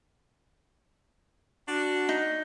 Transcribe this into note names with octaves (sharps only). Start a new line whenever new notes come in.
D4 F#4
D#4